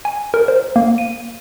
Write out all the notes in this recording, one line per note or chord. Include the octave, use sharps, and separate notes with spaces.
G#5
A#4
C5
A#3
D#7